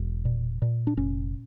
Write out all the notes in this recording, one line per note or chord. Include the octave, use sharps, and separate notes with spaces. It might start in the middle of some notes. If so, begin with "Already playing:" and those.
Already playing: E1
A#2
A#2
D4
F1 C#4